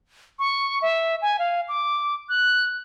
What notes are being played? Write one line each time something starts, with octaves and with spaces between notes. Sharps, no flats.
C#6
E5
G#5
F5
D6
F#6